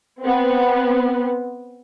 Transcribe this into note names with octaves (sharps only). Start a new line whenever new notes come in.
B3 C4